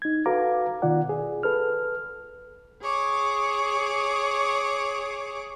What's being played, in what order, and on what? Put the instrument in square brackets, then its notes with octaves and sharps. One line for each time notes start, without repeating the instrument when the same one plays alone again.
[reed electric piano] D#4 G#6
F#4 A4 B4 F5 A#5 D6
B2 D#3 F4 D5 F#5
G#4
A4 B4 F6
[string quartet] G#4 C#5 D6